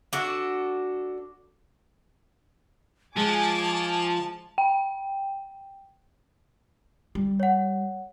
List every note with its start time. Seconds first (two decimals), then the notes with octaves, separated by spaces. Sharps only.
0.13 D4 F#4 A4
3.17 F3 G#3 G#5 A5 D6
4.58 G5
7.15 G3
7.40 C#5 F#5